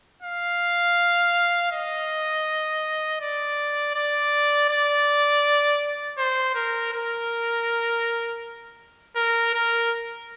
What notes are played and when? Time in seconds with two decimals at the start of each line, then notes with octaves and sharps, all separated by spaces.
0.22 F5
1.72 D#5
3.21 D5
3.95 D5
4.70 D5
6.18 C5
6.55 A#4
6.93 A#4
9.16 A#4
9.54 A#4